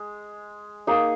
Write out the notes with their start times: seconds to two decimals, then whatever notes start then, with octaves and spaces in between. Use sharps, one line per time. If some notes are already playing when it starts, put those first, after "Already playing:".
Already playing: G#3
0.87 A#3 D#4 G#4